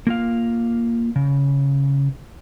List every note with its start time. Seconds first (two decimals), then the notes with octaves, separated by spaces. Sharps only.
0.07 A#3 F4 F5
1.16 C#3